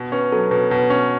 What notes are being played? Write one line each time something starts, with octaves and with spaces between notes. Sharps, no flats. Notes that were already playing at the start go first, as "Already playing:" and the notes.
Already playing: B2
C#4 B4
F#3 A4
B2 B4
B2
C#4